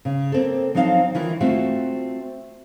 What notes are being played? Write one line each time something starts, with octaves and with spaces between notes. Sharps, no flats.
C#3
A#3 C4 A4
F3 F#3 C4 D#4 F5
D#3 E3 E4 F4
A3 C4 F4 F#4